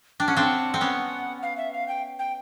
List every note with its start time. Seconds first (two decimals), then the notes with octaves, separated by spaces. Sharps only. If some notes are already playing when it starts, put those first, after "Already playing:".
0.20 D4 G5
0.28 C#4 F#5
0.36 C4 D4 F5
0.44 F#5
0.74 C4
0.81 B3 C#4
1.43 F5
1.57 E5
1.73 F5
1.88 G5
2.19 G5